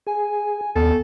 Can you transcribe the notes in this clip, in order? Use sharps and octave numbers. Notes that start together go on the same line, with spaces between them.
G#4 G#5
D#2 B3 A4